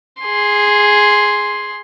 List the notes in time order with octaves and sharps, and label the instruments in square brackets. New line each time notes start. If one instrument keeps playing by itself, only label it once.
[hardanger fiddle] G#4 C6